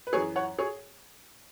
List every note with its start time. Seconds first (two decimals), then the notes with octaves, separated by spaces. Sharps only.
0.07 B4
0.13 F#2 E3 G#4 C#5
0.36 C#5 F#5
0.59 G#4 C#5